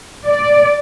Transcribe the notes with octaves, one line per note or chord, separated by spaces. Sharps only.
D5